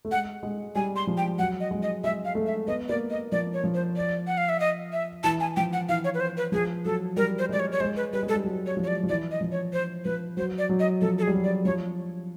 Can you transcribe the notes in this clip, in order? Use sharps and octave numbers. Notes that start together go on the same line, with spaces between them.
A3
G#3 F#5
G#3
G3 G#5
C6
F3
G5
F#3 F#5
D#5
G#3
D#5
G#3 E5
F5
A3
E5
B3 D#5
A#3 D5
D#5
F3 D5
C#5
F3
C5
D5
F#5
F5
E5
D#5
E5
E3 A5
G#5
F3 G5
F#5
E3 F5
C#5
B4
C5
B4
F3 G#4
F#3 A4
G3 A#4
C5
G#3 D5
C#5
C#5
G#3 C5
B4
G3 B4
G#3
A4
G3
F#3
C#5
F3
C#5
D5
F3
E3 D5
D#5
F3
C#5
C5
F3 B4
F#3 C5
D5
F#3
D#5
F3 A4
A4
G#4
G3
F#3
D5
F3 C#5